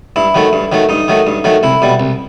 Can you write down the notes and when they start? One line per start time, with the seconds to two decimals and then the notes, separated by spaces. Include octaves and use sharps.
0.16 G2 E4
0.34 D#3 F#3 A3
0.53 G2
0.72 D#3 F#3 A3
0.89 G2 D#4
1.08 D#3 F#3 A3
1.27 G2
1.44 D#3 F#3 A3
1.63 C2 E4
1.82 B2 G3
2.00 C2